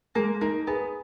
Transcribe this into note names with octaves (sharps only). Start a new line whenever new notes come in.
G#3 A#3
A#3 D#4
B3 G#4